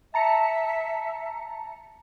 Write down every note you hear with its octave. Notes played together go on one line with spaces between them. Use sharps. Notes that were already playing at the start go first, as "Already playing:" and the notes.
E5 A5 A#5 C#7